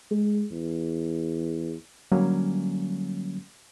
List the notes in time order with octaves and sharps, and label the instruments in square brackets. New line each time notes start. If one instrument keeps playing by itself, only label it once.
[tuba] G#3
E2
[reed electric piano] D3 F#3 G3 A#3 C#4